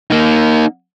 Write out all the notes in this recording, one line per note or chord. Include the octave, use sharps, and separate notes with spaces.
A#3 D#4